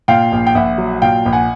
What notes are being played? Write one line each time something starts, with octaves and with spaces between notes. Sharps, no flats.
A#2 F5 G5
A#1
G5
A#1 E5 F#5
F#3
A#2 F5 G5
A#1
F#5 G#5